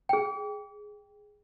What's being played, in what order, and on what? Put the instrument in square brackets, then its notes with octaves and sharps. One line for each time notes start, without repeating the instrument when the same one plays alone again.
[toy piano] G#4 G5